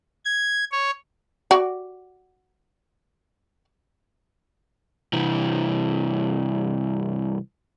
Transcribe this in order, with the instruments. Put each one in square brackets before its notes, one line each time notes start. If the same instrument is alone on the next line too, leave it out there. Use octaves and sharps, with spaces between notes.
[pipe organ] G#6
C#5
[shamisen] F#4 D5
[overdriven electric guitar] C2 E3